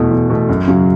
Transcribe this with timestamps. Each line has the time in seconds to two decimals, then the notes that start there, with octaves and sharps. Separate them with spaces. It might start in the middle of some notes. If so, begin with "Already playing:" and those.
Already playing: E2 B2 A3
0.11 E2
0.30 B2 A3
0.49 F#2
0.67 C#3 F#3